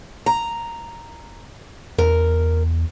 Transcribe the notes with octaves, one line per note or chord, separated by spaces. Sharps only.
A#5
E2 A#4